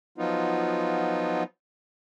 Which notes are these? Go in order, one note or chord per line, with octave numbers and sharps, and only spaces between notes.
F3 F#3 B3 D#4 F4